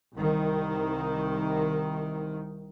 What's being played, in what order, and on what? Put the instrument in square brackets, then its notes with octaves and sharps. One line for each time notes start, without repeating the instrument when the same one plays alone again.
[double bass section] C2 D#3